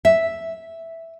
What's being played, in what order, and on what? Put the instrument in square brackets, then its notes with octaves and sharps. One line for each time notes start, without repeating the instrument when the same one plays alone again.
[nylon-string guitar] E5